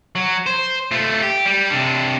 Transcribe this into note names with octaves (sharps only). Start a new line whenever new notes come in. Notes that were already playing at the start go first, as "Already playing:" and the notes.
F#3
C5
A3 F4
G4
G3
C3 D4